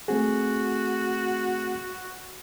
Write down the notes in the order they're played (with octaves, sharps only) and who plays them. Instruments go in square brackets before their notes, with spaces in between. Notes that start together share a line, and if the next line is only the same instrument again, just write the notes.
[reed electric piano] A3 C4 G#4 [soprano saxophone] F#4